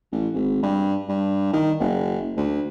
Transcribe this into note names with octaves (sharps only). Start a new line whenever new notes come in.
A1
G#1
G2
G2
D#3
F#1
D2